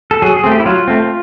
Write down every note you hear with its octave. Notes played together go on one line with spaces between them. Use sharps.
A4
F#3 G#4
G#4
A3 C4
G4
E4
F#3 F4
A3 C4